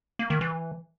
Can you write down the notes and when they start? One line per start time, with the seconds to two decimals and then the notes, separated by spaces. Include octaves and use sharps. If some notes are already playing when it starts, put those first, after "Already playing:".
0.19 A#3
0.30 D#3
0.41 E3